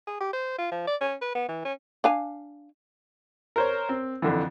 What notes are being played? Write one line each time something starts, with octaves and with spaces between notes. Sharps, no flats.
G#4
G4
C5
F4
F3
D5
C#4
B4
B3
E3
C#4
D4 F5 G#5
A#4 C5 C#5
C4
F2 D3 E3